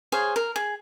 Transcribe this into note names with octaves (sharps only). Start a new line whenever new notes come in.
G#4 C5 C#5 F5
A#4
G#4